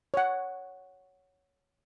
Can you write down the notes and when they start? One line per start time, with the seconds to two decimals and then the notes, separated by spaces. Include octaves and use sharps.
0.14 C#5 F#5